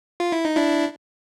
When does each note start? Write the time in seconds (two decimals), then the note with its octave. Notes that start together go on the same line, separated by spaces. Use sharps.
0.20 F4
0.32 E4
0.45 D#4
0.56 D4 E4